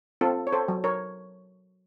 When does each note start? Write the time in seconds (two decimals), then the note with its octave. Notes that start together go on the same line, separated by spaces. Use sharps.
0.21 C4 F4 A4
0.47 C#5
0.53 A4 C5
0.68 F#3
0.84 A#4 C#5